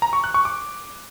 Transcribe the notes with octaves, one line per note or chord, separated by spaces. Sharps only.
A#5
C#6
F#6
C#6
D6